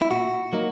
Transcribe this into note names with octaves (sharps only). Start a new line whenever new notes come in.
E4
A#2 F#4
F#3 A#3 D#4